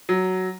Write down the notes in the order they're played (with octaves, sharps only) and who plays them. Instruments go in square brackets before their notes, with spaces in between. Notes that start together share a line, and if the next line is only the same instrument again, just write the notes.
[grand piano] F#3